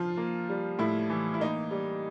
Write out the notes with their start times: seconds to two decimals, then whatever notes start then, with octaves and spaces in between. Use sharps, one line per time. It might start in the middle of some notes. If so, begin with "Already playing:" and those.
Already playing: F3 F4
0.17 A#3
0.49 G3
0.79 A2 E4
1.10 E3
1.34 E4
1.40 A#3 D#4
1.71 G3